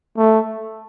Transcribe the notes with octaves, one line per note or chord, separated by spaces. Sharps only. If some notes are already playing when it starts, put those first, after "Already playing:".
A3